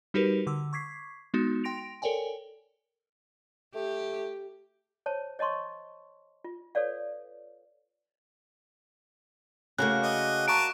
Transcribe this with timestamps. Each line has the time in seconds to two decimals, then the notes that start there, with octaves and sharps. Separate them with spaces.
0.14 G3 D#4 F#4 G4 A#4 B4
0.47 D3 D6 E6
0.73 C#6 D6 G#6 B6 C7
1.34 G#3 B3 D#4 F#4
1.64 G5 C6 A#6 D7 F7
2.02 A4 A#4 C#5 D5 G5 G#5
3.75 A3 G4
5.06 C5 C#5 A5
5.39 C#5 D#5 A5 C6 C#6
6.44 F4
6.75 A4 B4 C#5 D5 F5
9.78 C#3 A3 A#3 D4 F#4 F#6
10.03 D#5
10.48 A5 A#5 C#6 D7